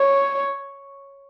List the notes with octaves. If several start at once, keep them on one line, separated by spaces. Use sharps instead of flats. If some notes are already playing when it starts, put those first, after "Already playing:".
Already playing: C#5